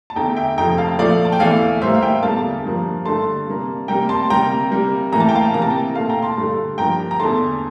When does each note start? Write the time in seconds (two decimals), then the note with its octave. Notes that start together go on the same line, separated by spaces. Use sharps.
0.10 A5
0.16 E2 D3 A3 G5 A#5
0.36 E5 G5
0.58 F2 C3 F3 A3 G5 A#5
0.78 F5 A5
0.99 A#2 F3 A3 D5 F5
1.25 A5
1.32 G5
1.40 E2 E3 A3 D5 F5
1.82 A2 G3 A#3 C5 E5
1.94 F5
2.02 E5 G5
2.23 E2 D3 G3 A#3 F5 A5
2.64 G2 F3 A#3
3.05 G2 D3 A3 A5 C6
3.47 C3 G3 A#3
3.88 C3 G3 A#3 G5 A#5
4.09 A5 C6
4.30 C3 G3 A#3 G5 A#5
4.71 C3 G3 A#3
5.12 A2 E3 A#3 A#5
5.20 A5
5.29 G5
5.35 F5 A5
5.53 C3 E3 A#3 A#5
5.62 A5
5.70 G5 A#5
5.95 A#2 A3 F5 A5
6.09 G5 A#5
6.22 A5 C6
6.37 G2 D3 A3
6.78 G2 F3 A#3 G5 A#5
7.11 A#5
7.20 E2 D3 A3 A5 C6